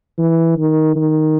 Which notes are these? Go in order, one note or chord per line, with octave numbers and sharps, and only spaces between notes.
E3
D#3
D#3